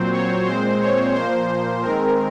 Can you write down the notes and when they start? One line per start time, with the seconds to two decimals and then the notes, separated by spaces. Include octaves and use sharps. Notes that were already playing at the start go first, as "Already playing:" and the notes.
Already playing: A#2 F#3 C4 C5
0.12 C#5
0.46 A#2 G#3 C4 C5
0.80 C#5
1.14 A#2 F3 A#3 C5
1.82 D#3 G#3 C4 A#4